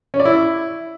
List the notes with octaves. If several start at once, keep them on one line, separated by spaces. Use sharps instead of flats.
C#4
D5
E4